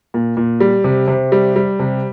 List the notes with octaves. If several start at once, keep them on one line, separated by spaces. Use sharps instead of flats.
A#2
A#2
G3
C3
C3
G3
G3
C3